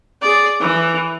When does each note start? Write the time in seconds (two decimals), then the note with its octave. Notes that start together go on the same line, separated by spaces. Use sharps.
0.22 G#4 D5
0.60 E3